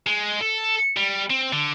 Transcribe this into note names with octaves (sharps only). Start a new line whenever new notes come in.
G#3
A4
G3
C4
D3